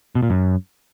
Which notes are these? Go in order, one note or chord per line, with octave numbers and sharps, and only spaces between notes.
B2
A#2
F#2